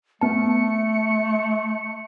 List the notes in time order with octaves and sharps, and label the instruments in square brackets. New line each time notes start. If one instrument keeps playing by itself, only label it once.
[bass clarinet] A3 [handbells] B3 A5 [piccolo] C#7